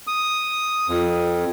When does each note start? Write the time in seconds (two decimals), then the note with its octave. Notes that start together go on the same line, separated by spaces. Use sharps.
0.07 D#6
0.88 F2